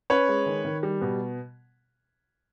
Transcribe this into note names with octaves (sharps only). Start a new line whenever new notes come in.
C#4 B4 C#5
G#3
D#3
D#3
G3
B2